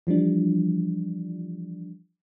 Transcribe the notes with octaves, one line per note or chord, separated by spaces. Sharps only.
E3 F3 G3 D4